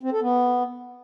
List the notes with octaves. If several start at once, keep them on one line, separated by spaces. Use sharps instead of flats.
C4
A4
B3